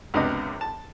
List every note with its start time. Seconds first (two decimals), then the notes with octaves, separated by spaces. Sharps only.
0.14 C#2 F#2 C3 B3 D4 D#5
0.61 A5